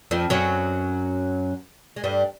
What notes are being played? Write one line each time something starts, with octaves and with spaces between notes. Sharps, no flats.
F2 F3
F#2 F#3
G#3
G2 G3